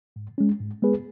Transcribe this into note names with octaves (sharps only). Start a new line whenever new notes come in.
G#2
G#3 C#4
G#2
G#3 B3 G#4 B4